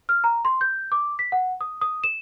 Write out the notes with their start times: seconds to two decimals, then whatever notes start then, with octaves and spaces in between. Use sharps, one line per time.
0.09 F6
0.24 A#5
0.45 C6
0.61 G6
0.92 D6
1.19 B6
1.32 F#5
1.61 D#6
1.81 D#6
2.04 E7